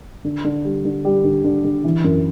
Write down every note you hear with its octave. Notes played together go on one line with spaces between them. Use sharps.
D3
D3
G3
D3
G3
D3
D3
D3
E3
F#2